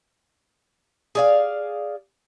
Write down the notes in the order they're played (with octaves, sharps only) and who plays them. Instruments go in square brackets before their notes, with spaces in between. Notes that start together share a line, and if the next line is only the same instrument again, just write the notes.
[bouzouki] G#4 D5 F5